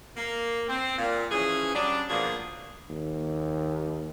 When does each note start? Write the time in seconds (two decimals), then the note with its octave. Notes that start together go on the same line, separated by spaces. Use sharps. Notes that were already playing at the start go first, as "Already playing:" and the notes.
0.17 A#3
0.68 C4
0.98 A#2
1.31 E3 F3 C#4 G#4
1.75 F#3 G3 C#4 D4
2.09 B2 F3 A#3 D4 F4 G#4
2.89 D#2